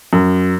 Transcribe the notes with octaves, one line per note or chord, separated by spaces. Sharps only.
F#2